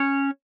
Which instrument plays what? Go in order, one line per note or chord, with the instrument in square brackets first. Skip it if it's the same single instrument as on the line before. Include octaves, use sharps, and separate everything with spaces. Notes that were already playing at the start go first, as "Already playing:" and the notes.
Already playing: [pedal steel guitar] C#4 C#5